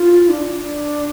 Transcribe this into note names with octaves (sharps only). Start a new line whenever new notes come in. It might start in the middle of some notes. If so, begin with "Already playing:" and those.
Already playing: F4
D4
D4